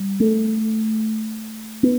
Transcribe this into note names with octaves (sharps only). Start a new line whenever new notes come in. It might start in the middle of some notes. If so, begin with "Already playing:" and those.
Already playing: G3
A3
B3